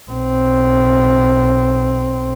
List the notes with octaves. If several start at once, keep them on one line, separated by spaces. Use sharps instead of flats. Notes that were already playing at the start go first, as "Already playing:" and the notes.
B1 C4